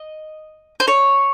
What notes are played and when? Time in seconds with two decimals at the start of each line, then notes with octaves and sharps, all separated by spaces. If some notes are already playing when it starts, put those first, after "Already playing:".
Already playing: D#5
0.80 C5
0.87 C#5